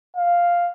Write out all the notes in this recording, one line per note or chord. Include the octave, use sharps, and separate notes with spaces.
F5